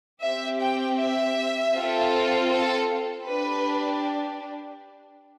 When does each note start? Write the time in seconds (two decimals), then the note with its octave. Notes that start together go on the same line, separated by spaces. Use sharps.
0.20 C4 G4 E5
0.58 G5
0.97 E5
1.73 C4 F4 A4
2.49 A4
3.25 D4 G4 B4